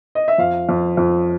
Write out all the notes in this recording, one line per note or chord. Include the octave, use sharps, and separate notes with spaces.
D#5
E5
F2 F5
F2
F2